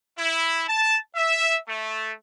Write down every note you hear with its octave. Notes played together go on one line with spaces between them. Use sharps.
E4
A5
E5
A3